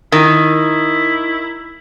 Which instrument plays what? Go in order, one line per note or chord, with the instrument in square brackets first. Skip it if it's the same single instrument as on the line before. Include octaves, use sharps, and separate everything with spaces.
[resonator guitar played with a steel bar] D#3 [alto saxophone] E4